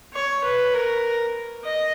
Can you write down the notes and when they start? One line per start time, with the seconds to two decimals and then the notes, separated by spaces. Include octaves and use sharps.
0.14 C#5
0.44 B4
0.74 A#4
1.64 D#5